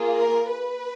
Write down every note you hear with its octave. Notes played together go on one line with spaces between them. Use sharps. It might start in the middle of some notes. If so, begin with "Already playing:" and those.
Already playing: A#3 F4 G#4
A#4
B4